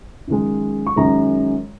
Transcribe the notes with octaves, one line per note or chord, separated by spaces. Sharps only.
F#2 D#3 G#3
C#6
F#2 D#3 G#3 A#5